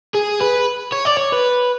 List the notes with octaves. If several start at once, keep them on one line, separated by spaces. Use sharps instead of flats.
G#4
B4
C#5
D5
C#5
B4